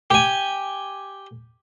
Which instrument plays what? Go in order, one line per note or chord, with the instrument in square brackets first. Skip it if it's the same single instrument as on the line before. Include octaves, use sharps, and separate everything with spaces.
[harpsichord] G4 G#5